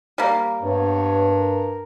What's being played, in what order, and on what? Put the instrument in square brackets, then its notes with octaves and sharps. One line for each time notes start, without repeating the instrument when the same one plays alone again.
[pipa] G3 A#3
[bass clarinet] G2 [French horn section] C3 B3 C#5
[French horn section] A#4